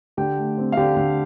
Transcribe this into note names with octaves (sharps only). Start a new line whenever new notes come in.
D3 G4 G5
A3
C4
F5
D3 G4 G5
D3